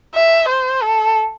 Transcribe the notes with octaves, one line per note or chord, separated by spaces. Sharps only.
E5
C5
A4